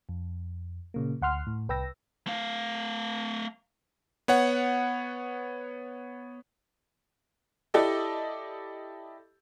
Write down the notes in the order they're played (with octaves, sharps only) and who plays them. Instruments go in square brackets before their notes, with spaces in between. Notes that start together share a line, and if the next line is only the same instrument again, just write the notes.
[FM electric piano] F2
A#2 C#3 A#3
D2 F#5 C6 F6
A2
C2 B4 G5 E6 A#6
[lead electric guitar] A3 F5
[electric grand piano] B3 C#5 F#5
[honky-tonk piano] E4 G4 A4 D5 D#5